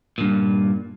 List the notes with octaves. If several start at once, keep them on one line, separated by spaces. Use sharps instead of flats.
G2 A#2